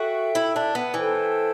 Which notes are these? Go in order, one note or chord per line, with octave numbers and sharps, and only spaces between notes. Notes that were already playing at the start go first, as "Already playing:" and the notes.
Already playing: F#4 A4 E5 G5
E4
D4
B3
E3 A4 C5 G5